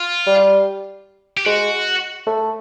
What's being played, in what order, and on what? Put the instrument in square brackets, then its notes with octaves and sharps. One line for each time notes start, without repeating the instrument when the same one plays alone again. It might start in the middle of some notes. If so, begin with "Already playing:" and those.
Already playing: [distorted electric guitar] F4
[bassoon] G3
[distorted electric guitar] G4
[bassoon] G#3 [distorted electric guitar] F#4
[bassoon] A3